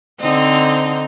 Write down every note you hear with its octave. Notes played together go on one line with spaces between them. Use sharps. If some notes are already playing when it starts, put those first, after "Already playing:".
D3 C4 D#4